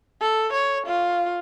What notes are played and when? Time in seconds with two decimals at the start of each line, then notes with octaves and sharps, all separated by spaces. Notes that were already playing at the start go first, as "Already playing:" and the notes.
0.21 A4
0.53 C#5
0.87 F4